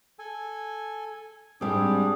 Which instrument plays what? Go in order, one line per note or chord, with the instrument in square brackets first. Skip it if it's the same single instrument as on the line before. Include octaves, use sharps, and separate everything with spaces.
[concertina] A4 G#5
[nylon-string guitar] G#2 G3 C4 [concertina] D4 G4 G#4